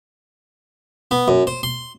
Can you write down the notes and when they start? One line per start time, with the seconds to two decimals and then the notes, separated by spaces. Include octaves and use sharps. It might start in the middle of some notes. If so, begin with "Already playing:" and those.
1.11 B3
1.28 F#2
1.47 C5
1.63 C6